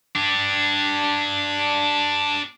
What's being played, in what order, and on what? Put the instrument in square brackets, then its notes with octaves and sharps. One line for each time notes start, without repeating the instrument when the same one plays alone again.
[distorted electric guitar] D4 G4